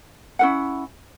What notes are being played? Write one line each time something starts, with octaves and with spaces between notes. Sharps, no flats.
C#4 E4 B4 F#5